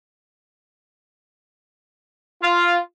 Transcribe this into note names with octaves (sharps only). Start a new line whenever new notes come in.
F4